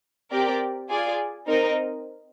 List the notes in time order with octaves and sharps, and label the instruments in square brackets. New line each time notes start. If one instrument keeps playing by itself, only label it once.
[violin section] C4 G4 A#4 D5
F4 G#4 D5 G#5
C4 D#4 A#4 D#5